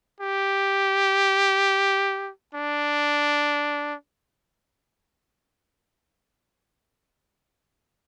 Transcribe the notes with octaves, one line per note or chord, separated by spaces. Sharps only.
G4
D4